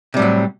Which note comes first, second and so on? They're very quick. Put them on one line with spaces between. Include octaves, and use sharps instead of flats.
C3 G3 A2 F#3